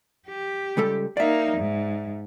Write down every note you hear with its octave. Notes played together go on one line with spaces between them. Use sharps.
G4
C#2 G3 A4
A#3 D#4 D5 E5
G#2